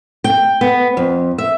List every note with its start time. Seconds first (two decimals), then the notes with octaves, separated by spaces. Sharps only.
0.24 G5
0.61 B3
0.97 F2
1.38 E5